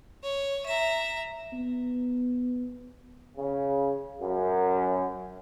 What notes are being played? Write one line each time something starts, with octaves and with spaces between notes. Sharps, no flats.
C#5
E5 A#5
B3
C#3
F#2